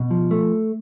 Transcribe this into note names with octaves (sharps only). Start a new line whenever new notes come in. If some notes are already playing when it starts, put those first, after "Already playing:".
Already playing: B2
F3
A3